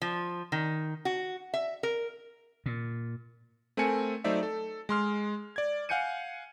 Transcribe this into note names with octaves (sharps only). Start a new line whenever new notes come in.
F3
D#3
F#4
E5
A#4
A#2
A3 C4 A4 A#4 G#5 C#7
F#3 A3 D#4 C5 D5 E5
A4
G#3 C6 F6
D5 G#6
F5 F#5 G#5 G6 C#7 D#7